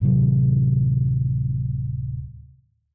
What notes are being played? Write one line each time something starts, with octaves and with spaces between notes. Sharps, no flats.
D1 C3 D#3 F#3